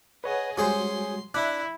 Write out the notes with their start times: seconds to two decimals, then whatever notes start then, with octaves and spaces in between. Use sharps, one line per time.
0.24 G#4 B4 C#5 D#5 F#5
0.58 G3 G#3 C#4 F#4 G#4 C5 C6
1.34 D4 E4 E5 F#6